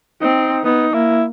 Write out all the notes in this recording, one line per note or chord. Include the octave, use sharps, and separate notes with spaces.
C4 D#4
B3 D#4
A#3 E4